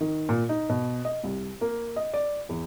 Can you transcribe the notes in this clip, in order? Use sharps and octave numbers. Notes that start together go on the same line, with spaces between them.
D#3
A#2
D#4
B2
D#5
C2
A#3
D#5
D5
E2